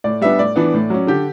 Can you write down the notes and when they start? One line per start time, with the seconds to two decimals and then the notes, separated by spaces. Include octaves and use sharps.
0.04 A2 D5
0.21 G3 B3 D4 E5
0.39 A2 D5
0.56 E3 B3 D4
0.74 A2
0.90 F#3 C#4
1.07 D3 G4